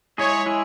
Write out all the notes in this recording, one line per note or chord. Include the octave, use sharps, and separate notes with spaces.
G#3 E4 G#4 C#5
G#3 E4 G#4